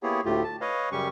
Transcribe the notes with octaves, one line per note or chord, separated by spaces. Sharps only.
A#3 B3 E4 G4 G#4 C#5
D2 A2 A3 F4 G4
A5
B4 C#5 D#5 F5
F#2 C#3 G3 C#4 G4 C#6